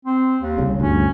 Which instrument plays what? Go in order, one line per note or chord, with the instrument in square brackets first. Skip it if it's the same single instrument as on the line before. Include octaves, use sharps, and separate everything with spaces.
[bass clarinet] C4
D#2
[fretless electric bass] C2 C#3
[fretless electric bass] G1 D2 [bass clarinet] C#4